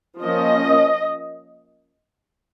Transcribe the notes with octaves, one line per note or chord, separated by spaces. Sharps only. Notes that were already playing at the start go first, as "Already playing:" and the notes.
F3 A#3 C#4 D#5